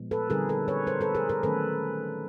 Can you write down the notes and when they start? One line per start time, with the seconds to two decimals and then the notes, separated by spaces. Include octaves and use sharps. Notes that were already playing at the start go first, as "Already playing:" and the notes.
Already playing: A#2 F3 G#3 B3
0.11 A4 B4
0.30 D3 G3 C4 D#4 G#4 A#4
0.49 A4 B4
0.68 B4 C#5
0.87 A#4 C5
1.01 A4 B4
1.15 G#4 A#4
1.29 G#4 A#4
1.43 D#3 F#3 A3 C#4 A4 B4